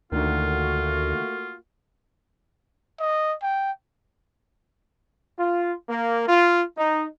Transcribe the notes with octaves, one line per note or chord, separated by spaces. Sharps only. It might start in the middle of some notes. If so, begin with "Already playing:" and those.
D2 D3 D#3 A3 A#3 F4 F#4
D#5
G5
F4
A#3
F4
D#4